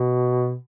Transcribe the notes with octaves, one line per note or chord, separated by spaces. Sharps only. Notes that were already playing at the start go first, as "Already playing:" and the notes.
Already playing: B2